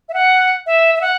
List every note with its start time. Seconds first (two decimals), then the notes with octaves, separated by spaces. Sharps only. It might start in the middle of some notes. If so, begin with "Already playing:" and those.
0.09 E5
0.14 F#5
0.66 E5
0.95 E5
1.01 F#5